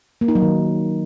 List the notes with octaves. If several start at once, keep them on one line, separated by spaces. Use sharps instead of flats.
A#3
D#4
F#3
D#3